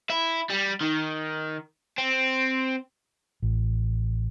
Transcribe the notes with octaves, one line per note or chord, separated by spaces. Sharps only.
E4
G3
D#3
C4
A1